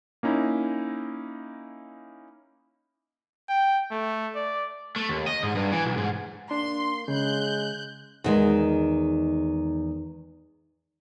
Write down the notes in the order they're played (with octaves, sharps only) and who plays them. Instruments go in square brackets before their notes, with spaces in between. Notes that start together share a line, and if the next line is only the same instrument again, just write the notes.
[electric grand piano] A#3 C#4 D#4 E4
[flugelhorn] G5
A3
D5
[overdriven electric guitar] A3
D#2
D#5
G#2
G2
E3
B1
G#2
[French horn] A#3 [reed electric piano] D4 [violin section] C6
[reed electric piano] C#3 [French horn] G#3 [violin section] F#6 G6
[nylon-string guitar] E2 D#3 G#3